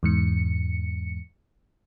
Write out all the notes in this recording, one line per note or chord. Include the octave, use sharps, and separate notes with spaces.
E2 G#2 C#7